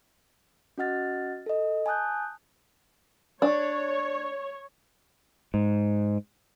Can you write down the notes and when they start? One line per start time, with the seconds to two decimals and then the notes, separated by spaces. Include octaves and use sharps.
0.78 C#4 F#4 D#5 F#5 F6 A6
1.46 A4 D#5
1.86 G#5 A5 D#6 F#6 G6
3.42 D4 C#5
5.54 G#2